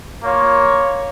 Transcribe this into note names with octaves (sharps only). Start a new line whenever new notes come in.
A#3 F4 C#5